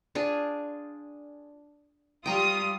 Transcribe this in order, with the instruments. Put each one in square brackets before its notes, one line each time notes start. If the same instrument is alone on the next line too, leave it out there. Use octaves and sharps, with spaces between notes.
[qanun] D4 F4 G#4
[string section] G3 F4 D#6 [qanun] G5 A#5 C#6